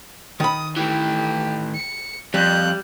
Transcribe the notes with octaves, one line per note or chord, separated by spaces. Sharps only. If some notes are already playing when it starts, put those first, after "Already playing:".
D#3 B5 D#6
A2 E3 G4
C#7
F2 G3 F#6 G6